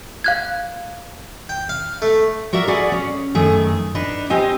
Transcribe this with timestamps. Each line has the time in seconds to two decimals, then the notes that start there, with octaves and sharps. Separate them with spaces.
0.24 F5 F#6 G#6
1.49 G5
1.69 F5
2.02 A3
2.53 F#4 A#4 D5 E5
2.67 F#4 G#4 B4 D5 F#5
2.92 C#4
3.35 F#2 D#3 A3 G#4
3.95 D4 D#4 B4
4.30 C4 G4 D#5 G#5